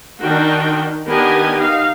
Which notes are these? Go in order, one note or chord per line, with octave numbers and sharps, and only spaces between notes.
D#3 D4 F#4 G5
D#3 B3 D4 G4 A#4 G#5
D#4 F5